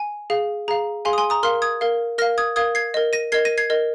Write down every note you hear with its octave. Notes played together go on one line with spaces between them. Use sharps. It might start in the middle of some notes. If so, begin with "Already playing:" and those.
Already playing: G#5
G#4 F5
G#4 F5 A#5
G#4 F5 G#5 C6
D#6
G#5 C6
A#5 D#6
A#4 F5 C6 F6
D#6 G#6
A#4 F5
A#4 F5 F6 A#6
D#6 G#6
A#4 F5 D#6 G#6
G#6 C7
A#4 D#5
A#6 D#7
A#4 D#5 G#6 C7
A#6 D#7
G#6 C7
A#4 D#5